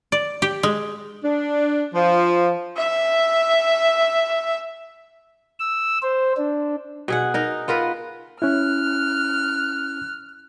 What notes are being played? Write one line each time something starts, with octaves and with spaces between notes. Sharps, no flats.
D5
G4
G#3
D4
F3
E5 E6
E6
C5
D4
B2 G#4 F#5
D#4 A#4
B3 F4 A#4 B4
C#4 E4 F6 F#6